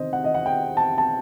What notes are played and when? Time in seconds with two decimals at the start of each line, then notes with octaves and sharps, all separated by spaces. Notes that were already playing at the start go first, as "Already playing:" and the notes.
Already playing: C3 D#3 C5 D#5
0.13 F#5
0.24 D#5
0.34 F#5
0.46 G5
0.77 A5
0.98 A5